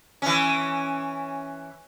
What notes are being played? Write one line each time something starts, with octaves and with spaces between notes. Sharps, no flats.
E3 C#4